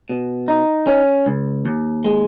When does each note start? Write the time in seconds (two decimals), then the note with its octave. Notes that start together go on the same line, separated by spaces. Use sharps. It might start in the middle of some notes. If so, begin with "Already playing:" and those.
0.09 B2
0.48 D#4
0.87 C#4
1.26 C#2
1.65 D#2
2.04 G#3